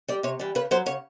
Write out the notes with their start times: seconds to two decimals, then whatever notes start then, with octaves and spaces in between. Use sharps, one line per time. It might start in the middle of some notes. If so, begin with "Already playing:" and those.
0.08 G3 D5
0.23 C3 C#5
0.39 E3 G3
0.55 C#3 B4
0.71 F#3 C5
0.86 C#3 C#5